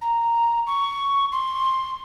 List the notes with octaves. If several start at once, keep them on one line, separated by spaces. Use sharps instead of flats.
A#5
C#6
C6